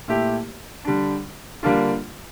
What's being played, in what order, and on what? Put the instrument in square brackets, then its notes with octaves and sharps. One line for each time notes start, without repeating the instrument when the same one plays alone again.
[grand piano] A#2 A3 E4 G4
D3 G3 D4
D3 G3 A#3 D4 F4